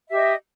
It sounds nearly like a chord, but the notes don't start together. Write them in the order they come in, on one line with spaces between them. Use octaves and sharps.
E5 G4 D#5